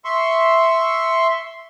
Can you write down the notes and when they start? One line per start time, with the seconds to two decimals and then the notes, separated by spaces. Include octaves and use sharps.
0.05 E5 C6 C#6